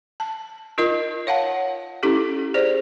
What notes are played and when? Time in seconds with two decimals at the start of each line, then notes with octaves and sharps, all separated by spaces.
0.20 A5
0.78 D#4 F4 A#4 D#5
1.27 C#5 F5 F#5 A5
2.03 C#4 D#4 E4 G4 A4
2.54 G#4 C5 D5